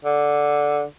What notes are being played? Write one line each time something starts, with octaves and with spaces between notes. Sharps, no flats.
D3